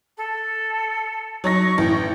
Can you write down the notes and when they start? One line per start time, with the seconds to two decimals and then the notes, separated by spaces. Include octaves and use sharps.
0.17 A4
1.44 F#3 D#4 C#6 A#6
1.78 A1 G5